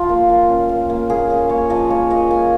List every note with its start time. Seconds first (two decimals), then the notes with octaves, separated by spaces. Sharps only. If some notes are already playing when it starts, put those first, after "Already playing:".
Already playing: F3 F4
0.09 A#3
0.29 F3
0.49 C#4
0.69 A#3
0.90 A#3
1.10 A#3 G#4
1.30 C#4 G#4
1.49 A#3 C#5
1.70 F3 D#5
1.90 A#3 C#5
2.10 F3 D#5
2.31 A#3 G#5